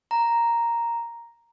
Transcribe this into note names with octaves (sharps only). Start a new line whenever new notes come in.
A#5